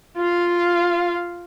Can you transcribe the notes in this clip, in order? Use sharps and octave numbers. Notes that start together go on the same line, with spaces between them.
F4 F5